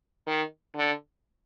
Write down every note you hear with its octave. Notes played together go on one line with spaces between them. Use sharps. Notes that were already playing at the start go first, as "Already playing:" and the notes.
D#3
D3